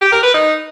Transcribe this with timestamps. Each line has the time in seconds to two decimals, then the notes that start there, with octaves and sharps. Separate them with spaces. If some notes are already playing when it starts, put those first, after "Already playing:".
0.01 G4
0.12 A#4
0.23 B4
0.34 D#4